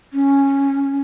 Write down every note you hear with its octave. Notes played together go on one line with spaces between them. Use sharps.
C#4